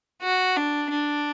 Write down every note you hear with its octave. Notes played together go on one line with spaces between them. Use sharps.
F#4
D4
D4